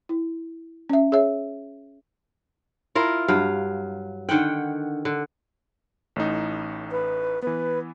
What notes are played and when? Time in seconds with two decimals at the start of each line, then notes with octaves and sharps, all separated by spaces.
0.09 E4
0.89 C#4 E5
1.12 G#4 C#5 E5
2.95 E4 F4 A#4 F5
3.28 G2 F#3 F5
4.29 D3 D#3 F#5 G5
5.05 D3
6.16 A1 A2 D#4
6.91 B4
7.42 E3 B3 B4